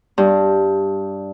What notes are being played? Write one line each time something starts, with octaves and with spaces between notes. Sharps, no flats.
G2